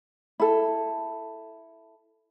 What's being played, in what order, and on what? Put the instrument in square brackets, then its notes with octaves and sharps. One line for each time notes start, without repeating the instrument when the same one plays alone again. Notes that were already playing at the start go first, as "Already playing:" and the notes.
[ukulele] E4 A4